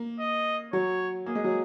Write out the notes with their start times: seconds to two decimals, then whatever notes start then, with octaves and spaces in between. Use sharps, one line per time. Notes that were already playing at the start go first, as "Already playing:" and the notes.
Already playing: A#3
0.19 D#5
0.73 F#3 C#5
1.26 A#3 G#4
1.35 G#3
1.44 F#3